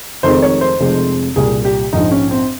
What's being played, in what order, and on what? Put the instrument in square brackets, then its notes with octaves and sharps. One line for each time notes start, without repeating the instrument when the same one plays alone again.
[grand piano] F1 F2 C3 D#3 G#3 C5
C#5
C5
F1 F2 C3 F3 G#3
C2 A#2 G3 G#4
G4
A#1 G#2 F3 D#4
C#4
C4